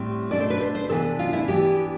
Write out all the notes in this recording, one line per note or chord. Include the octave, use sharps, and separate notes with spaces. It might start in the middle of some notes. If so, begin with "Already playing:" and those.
Already playing: A2 G3 C4
B2 A3 D4 D5
C5
B4
C5
C5
C3 E3 B3 D4 A4
F4
E4
E3 B3 D4 G4